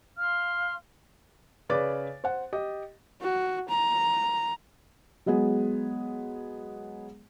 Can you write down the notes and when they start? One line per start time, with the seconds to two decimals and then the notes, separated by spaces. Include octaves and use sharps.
0.17 F5 C6 F6
1.69 C#3 B4 D5 D6 A6
2.24 C5 F#5
2.53 G4 D#5
3.21 F#4
3.69 A#5
5.26 F#3 G#3 B3 G#4